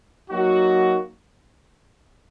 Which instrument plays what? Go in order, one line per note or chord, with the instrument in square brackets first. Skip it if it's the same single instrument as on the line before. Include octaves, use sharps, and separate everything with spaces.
[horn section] F#3 A#3 D#4 F#4